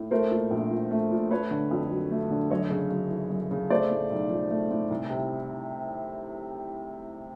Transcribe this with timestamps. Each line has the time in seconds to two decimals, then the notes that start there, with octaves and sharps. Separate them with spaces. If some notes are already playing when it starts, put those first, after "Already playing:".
Already playing: A2
0.11 A3 A#4 C5
0.31 A#2
0.51 A#1
0.71 F3
0.91 A3
1.11 A#2
1.31 A3 B4 C#5
1.51 D3
1.71 F2
1.90 F#3
2.11 A3
2.30 D3
2.50 F#2 C#5 D#5
2.70 C#3
2.90 F#2
3.11 E3
3.30 F#2
3.51 C#3
3.70 A3 C5 D5
3.91 A2
4.11 B1
4.30 F3
4.50 A3
4.71 A2
4.90 C2
5.10 C3